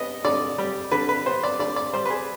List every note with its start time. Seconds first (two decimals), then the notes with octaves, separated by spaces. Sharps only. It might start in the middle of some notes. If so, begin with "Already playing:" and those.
Already playing: B3 D#5
0.25 D3 D5
0.58 G3
0.92 D3 B4
1.09 B4
1.26 B3 C5
1.43 D5
1.59 D3 D5
1.76 D5
1.93 G3 C5
2.05 B4
2.10 G#4